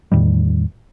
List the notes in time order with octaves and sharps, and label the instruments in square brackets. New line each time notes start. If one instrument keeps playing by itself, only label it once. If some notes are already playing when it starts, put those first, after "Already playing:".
[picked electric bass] E2 A2 D#3 G3